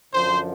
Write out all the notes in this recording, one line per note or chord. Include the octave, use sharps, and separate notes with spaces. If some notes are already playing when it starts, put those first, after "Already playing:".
F#2 D3 F3 C5